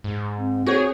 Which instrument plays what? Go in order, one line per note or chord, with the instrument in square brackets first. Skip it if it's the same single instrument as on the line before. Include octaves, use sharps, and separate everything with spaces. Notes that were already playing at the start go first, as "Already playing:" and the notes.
[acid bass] G#2
[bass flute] C4
[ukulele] F#4 C5 C#5 [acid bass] G#4